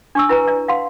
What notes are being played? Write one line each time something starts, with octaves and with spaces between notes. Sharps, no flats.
D4 C#6 E6
E4 B4 C#5 G#5 A#5
D5
F5 F#5 C6